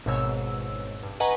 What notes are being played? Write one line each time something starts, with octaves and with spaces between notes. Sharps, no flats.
G#1 G#2 B2 C#5 E6
G2
B4 D#5 F#5 G#5 A#5 C#6